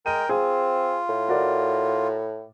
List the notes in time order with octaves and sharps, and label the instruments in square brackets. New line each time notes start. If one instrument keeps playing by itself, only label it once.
[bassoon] G#3 [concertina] A#4 G5 [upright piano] D#7
[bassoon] C4 [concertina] F4 [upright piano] G#4
[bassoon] A2
[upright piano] F#4 A#4 D5